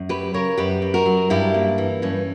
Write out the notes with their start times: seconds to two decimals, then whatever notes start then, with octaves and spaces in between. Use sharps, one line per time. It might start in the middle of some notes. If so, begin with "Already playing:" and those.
Already playing: F#2
0.09 F#3 G4 B4
0.34 C#3 A#4 C#5
0.57 F#2 G4 B4
0.82 F#2
0.94 F#4 A#4
1.06 F#3
1.30 G2 E4 G4
1.54 A#3
1.78 E3
2.02 G2 C#4